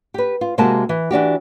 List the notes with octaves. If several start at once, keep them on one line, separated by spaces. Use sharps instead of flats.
G4 B4
F4
C3 G#3 A#3 F#4 A#4 A5
E3
E3 D4 F#4 G4